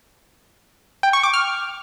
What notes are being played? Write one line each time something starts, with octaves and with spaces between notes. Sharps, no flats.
G5
C#6
D6
F6